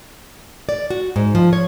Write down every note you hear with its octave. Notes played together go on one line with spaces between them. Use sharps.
D5
F#4
G#2
F3
C#5